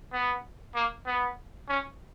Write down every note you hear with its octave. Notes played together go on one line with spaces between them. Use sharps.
B3
A#3
B3
C#4